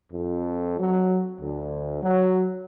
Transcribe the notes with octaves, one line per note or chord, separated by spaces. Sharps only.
F2
F#3
D2
F#3